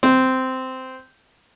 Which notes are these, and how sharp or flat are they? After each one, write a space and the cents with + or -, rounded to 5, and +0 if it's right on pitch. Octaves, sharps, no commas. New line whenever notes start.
C4 -10